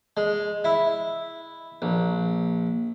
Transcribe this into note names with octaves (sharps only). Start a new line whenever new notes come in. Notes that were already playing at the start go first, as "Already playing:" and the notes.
G#3
E4
A#1